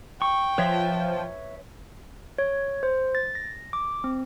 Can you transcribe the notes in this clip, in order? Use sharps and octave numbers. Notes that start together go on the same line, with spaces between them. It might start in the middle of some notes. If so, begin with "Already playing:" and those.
G5 C#6
F3 B4 C#5 E5
C#5
C5
A6
A#6
D6
C4